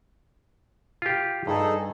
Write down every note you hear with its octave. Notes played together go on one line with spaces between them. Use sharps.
F4 G4
G2 D#4 G#4 A4